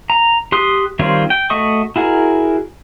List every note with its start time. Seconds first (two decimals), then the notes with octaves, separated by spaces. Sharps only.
0.10 A#5
0.52 G4 C6 D#6 F#6
0.99 D#3 G3 C4 F4 C#5
1.30 G5
1.50 A3 F#4 D#5 C#6 D#6
1.96 E4 F#4 G#4 A#4